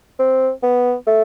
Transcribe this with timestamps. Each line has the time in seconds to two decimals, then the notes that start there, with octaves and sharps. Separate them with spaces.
0.20 C4
0.63 B3
1.07 A3